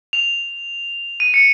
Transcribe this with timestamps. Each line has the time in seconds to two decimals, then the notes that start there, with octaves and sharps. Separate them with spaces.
0.13 F7
1.20 D#7
1.34 C#7